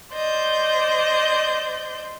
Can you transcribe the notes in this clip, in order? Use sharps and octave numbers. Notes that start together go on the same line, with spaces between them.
C5 D5 D#5 G6